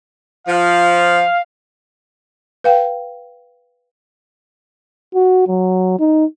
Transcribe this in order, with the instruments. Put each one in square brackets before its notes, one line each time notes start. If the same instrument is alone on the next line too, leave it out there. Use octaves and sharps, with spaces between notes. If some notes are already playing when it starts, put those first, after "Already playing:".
[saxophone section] F3 [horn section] F5
[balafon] B4 F5 G5
[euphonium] F#4
F#3
D#4